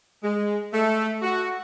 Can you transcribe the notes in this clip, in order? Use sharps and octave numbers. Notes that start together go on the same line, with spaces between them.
G#3
A3
F#4